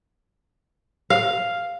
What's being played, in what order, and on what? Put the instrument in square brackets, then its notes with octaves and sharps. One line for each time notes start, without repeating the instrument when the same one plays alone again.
[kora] F5